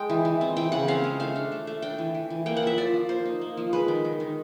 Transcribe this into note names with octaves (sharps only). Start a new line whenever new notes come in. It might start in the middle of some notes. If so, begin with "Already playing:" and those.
Already playing: G#3 G5
E3
E3
C4
E3 G5
C#3 F#5
C4 F5
G#3
A3 F5
D4
A3
A3
D4 G5
E3
E3
E3
A#3 G5
F#5
F3 E5
F3 D5
F3
A#3 C5
D#4
A#3
F3
G#3 B4
D#3
D#3
D#3